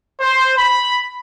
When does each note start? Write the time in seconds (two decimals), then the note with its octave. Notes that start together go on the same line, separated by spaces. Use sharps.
0.20 C5
0.58 B5